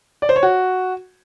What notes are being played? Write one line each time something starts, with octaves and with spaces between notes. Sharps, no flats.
D5
C5
C#5
F#4